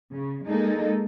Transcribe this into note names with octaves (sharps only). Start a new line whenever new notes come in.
C#3
G#3 A#3 D#4 A4